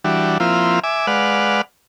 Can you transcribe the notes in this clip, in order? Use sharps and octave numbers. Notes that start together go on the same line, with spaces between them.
E3 G3 D4 F#4
F3 A#3 C4 E4 F4
E5 G#5 D6
G#3 B4 D5 F5 F#5